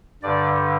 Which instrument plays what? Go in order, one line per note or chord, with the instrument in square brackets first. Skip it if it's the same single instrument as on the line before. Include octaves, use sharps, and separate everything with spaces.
[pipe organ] G2 D3 D5